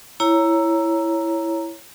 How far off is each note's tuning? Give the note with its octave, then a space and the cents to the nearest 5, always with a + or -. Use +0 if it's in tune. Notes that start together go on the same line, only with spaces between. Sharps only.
E4 +10 C#5 +0 A#5 +0